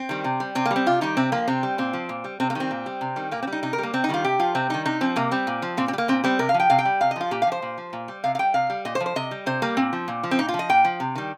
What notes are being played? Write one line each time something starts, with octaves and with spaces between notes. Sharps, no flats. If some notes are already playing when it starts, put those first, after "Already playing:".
Already playing: C4
D#3 G3
C3
G3
C3 C4
A#3
G3
C4
C3 F4
D#3 G3 D#4
C3 C4
F3 A#3
C3 C4
G3
A#2 C4
F3
A#2
G3
C3 C4
A#3
D#3 G3 C4
A#2
G3
C3
D#3 G3
A#2 A#3
C4
G3
D#4
C3 D#4
A#4
G3 A#3
C3 C4
D#4
D#3 G3 F4
C3 G4
F3 F4
C3 C4
D#3 G3 D#4
C3 D#4
F3 C4
C3 A#3
G3 C4
A#2
F3
A#2 C4
C4
G3
A#3
A#2 C4
G3 C4
C3 A#4
F5
F3
G5
C3 F5
G5
G3
C3 F5
D#5
F3 F4
A#2 G4
F5
F3 C5
A#2
F3
A#2
G3
C3 F5
F5
G3 G5
C3 F5
G3
A#2 D#5
C5
F3
C5
C3 D#5
G3
C3 C5
G3 A#3
A#2 C4
F3
A#2
F3
C4
A#2 D#4
F4
F3
D#5
A#2 G5
F3
C3
D#3 G3